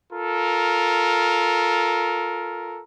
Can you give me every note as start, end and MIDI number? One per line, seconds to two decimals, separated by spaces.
0.12 2.82 65
0.12 2.82 69
0.12 2.82 70